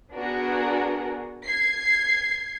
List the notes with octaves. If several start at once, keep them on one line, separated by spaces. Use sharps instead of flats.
B3 D4 F#4 G#4 A#4
G#6 C7